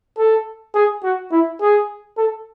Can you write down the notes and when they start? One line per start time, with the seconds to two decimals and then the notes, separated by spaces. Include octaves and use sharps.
0.18 A4
0.75 G#4
1.03 F#4
1.32 E4
1.61 G#4
2.17 A4